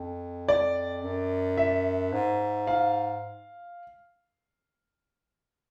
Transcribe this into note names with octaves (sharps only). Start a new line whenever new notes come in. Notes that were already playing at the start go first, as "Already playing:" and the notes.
Already playing: F2
D5
F#2
E5
G#2
F5